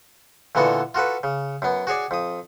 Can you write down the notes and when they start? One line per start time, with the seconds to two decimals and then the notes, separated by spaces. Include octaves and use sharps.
0.55 A#2 D3 E3 B3 F#4 A4
0.94 F4 F#4 A4 B4
1.23 C#3
1.62 F#2 B3
1.87 F#4 G#4 C#5 D5
2.11 F2 D#6